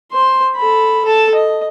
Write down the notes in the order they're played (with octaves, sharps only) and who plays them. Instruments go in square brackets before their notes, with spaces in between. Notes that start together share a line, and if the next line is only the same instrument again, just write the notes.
[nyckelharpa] C5 C6
A4 B5
A4 A5
D#5